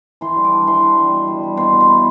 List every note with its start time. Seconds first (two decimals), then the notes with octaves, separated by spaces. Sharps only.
0.21 E3 C6
0.37 G3
0.44 D6
0.52 D4
0.67 E3 C6
0.83 D4
0.97 G3
1.12 B2
1.28 G3
1.43 G3
1.57 B2 C6
1.73 B3
1.81 C6
1.88 E4